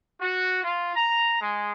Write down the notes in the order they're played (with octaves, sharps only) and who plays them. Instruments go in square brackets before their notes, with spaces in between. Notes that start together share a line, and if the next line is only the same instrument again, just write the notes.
[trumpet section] F#4
F4
A#5
G#3